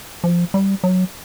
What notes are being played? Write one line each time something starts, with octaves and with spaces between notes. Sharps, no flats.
F3
G3
F#3